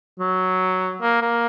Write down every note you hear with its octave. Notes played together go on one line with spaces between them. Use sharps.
F#3
A#3
A#3